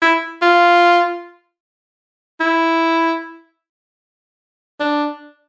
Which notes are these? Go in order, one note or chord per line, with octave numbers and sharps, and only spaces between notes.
E4
F4
E4
D4